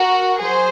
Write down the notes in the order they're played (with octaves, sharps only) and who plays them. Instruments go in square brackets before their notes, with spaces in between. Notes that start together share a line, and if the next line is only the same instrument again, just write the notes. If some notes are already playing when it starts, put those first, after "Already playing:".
Already playing: [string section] F#4 A#4
F#3 G#4 C5